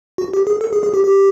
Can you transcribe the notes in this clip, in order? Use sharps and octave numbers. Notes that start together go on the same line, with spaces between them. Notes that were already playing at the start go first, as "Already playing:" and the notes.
F#4
G4
G#4
A4
G#4
G#4
G4
G4